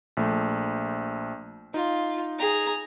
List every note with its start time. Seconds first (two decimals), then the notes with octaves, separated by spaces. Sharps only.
0.17 A#1 A3
1.74 D#4 F4
2.39 G#4 A#5